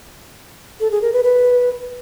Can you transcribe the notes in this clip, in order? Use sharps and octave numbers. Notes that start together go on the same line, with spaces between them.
A4
G#4
A#4
B4
B4